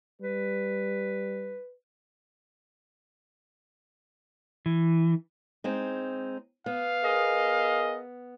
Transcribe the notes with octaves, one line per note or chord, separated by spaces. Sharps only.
G3 B4
E3
G#3 C4 D#4
B3 F5
G#4 A#4 D#5